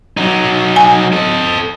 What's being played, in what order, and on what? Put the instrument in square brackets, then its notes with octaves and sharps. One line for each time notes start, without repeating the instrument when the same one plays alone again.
[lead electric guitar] F#3 D#4
[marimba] G#5
[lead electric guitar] A4 D#5